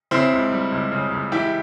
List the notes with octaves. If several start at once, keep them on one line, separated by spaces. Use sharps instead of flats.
C#3 C4 E4
C#2
G3
C#2
C#3
C#2
E3 E4 G4